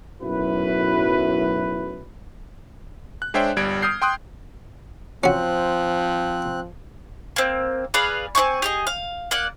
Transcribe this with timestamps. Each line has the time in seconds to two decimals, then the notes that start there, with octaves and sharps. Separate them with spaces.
0.22 B1 F#2 A2 E4 F#4 B4
3.22 F#6
3.34 G#3 D4 C5 C#5 E5 G5
3.56 G1 G3 G#6 D7
3.82 D#6 F6 G6 C7
4.02 G5 C6 D#6 F#6
5.24 F3 C4 C#4 F#4 F#6
7.36 A#3 C4
7.94 G#4 B4 D5 F5
8.35 C4 D#4 G#5 C#6
8.62 G4 G#4 D#5
8.87 F5
9.31 A#3 D5 F#5